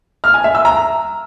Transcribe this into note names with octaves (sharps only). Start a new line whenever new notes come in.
F6
G#5
E5
E6
A#5